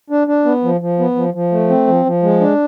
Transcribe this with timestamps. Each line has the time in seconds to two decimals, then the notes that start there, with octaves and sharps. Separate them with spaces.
0.10 D4
0.27 D4
0.45 B3
0.63 F3
0.81 F3
0.99 B3
1.16 F3
1.34 F3
1.52 A3
1.69 C4
1.87 F3
2.05 F3
2.23 G#3
2.41 D4